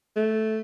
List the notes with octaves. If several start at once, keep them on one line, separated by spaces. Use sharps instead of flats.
A3